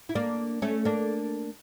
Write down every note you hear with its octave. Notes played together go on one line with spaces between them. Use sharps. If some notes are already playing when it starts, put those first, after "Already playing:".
E4
A#3 D4
A3 C#4
A#3 D4